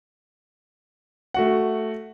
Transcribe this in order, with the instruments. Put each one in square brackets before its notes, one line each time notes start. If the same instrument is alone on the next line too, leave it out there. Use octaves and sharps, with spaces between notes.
[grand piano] A3 F#4 F#5